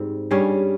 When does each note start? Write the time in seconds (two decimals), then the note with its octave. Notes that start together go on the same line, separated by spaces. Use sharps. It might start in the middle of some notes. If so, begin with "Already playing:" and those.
Already playing: G#2 G3 C4
0.31 G2 G3 C#4 G#4